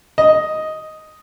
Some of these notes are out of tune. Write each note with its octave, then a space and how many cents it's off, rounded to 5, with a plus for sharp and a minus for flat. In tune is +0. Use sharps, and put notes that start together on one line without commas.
D#5 +5